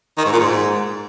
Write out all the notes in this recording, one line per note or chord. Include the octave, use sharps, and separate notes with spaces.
D#3
G#2
A#2
G#2